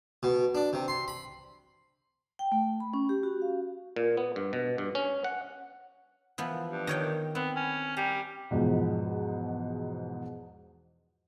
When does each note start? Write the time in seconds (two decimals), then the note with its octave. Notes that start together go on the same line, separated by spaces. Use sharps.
0.23 B2
0.55 D4
0.73 C3
0.88 C6
1.08 B5
2.39 G5
2.52 A3
2.80 B5
2.94 C#4
3.09 G4
3.23 F#4
3.42 F5
3.96 A#2
4.17 B3
4.36 G2
4.53 B2
4.78 G2
4.95 C#4
5.24 F#5
6.38 E3 F3 B3
6.70 G2
6.87 D#3 C#5 G5
7.35 B3 C4
7.56 C#4
7.97 G3 A#5
8.51 E2 G#2 B2 F3